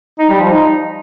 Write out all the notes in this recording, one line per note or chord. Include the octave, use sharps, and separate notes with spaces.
D#4
G3
F3
D#4